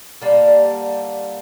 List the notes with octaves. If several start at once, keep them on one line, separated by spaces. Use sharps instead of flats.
D3 G3 A#3